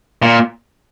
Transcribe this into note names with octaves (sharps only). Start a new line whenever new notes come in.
A#2